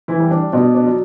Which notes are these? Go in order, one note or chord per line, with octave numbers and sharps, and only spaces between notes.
E3 E4
G3
D4
B2 D4
D4
F#3